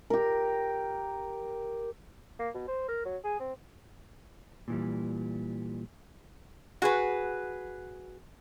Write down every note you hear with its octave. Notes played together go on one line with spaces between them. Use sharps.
G4 A#4
A#3
B2
C5
A#4
F#3
G#4
C4
A#2 E3 G3
F#4 G#4 B4